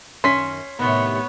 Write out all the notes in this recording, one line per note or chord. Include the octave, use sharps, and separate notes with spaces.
F#2 D#3 C#4 C6 B6
A2 C3 D#3 B3 C#5